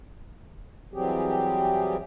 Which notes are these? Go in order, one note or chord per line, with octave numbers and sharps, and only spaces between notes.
E3 F#3 G3 C4 G4 G#4